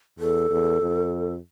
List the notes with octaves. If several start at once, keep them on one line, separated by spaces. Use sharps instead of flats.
E2 A4
E2
F2